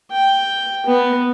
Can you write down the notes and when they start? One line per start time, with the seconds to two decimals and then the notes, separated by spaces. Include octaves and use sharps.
0.11 G5
0.86 B3